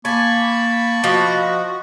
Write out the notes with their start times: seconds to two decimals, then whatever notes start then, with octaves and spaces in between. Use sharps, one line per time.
0.05 A#3 G#5 A5 B5 C#6
1.04 F3 F#4 D#5